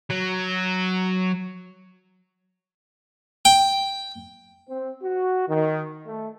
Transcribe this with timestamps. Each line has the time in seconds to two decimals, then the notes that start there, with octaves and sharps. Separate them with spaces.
0.10 F#3
3.45 G5
4.68 C4
5.03 F#4
5.48 D#3
6.06 A3